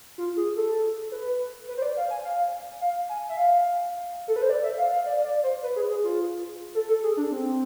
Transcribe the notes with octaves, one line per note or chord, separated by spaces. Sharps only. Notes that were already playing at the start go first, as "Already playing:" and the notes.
F4
G#4
A4
B4
B4
C5
D5
F5
G#5
F5
F5
G#5
E5
F5
A4
B4
C5
D5
E5
F5
F5
D5
D5
C5
B4
G#4
G#4
F4
A4
A4
G#4
D4
C4